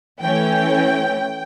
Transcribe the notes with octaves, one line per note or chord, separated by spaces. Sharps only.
E3 A3 C#4 G5